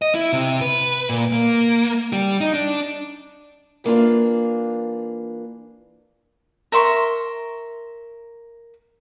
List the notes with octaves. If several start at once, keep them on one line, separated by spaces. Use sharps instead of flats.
D#5
E4
C3
B4
A#2
A#3
G3
D#4
D4
E3 A#3 D4 F4
A#4 E5 C6 C#6